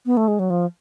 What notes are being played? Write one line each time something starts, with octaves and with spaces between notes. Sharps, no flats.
B3
A3
G#3
F#3
F3